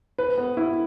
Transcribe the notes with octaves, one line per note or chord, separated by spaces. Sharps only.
B4
B3
E4